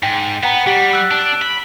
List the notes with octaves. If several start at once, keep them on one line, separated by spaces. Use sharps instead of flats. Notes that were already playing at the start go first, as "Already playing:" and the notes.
G#2 G5
B3 F#5 G5 A#5
G3 G4 F#5
E6 F#6
D4
B5